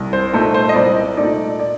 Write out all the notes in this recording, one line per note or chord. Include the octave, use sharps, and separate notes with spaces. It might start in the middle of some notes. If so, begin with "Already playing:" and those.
Already playing: C2
C5
A#2 A3 D#4 C5
C5
D#5
C2 D5
A#2 A3 D#4 D5
D5